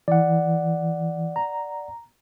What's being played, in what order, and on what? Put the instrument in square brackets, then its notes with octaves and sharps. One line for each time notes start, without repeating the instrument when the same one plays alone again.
[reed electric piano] E3 [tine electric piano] D5 F#5
[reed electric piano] A#5